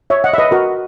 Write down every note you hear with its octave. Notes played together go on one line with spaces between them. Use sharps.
C#5 E5
D#5 F#5
E5
B4 D#5
F#4 A#4